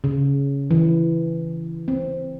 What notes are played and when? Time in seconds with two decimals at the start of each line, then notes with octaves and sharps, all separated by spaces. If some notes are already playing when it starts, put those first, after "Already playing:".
0.04 C#3
0.71 E3
1.88 C4